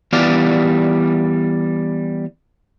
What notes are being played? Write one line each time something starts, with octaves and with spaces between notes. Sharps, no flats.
E3 G3 B3 G4 D5 F5